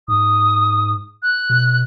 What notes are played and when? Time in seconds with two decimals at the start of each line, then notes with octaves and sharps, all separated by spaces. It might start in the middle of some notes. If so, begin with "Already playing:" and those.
0.08 G#2 D#6
1.23 F#6
1.50 B2